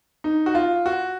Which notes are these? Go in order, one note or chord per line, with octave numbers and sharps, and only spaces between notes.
D#4
F#4
F4
F#4